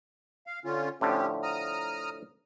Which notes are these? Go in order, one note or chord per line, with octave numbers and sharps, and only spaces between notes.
F5
D3 C#4 F4
A2 D3 F3 C#4 G4
A#5 D#6 F6